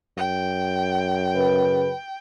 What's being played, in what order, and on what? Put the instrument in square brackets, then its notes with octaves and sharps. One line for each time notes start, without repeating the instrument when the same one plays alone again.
[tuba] F#2 [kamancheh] G5
[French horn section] C#3 B4